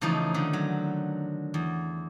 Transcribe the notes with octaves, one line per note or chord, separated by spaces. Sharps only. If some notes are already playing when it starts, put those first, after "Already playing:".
C#3 E3 F3 A3 D#4
D3 D#3
F#3
E2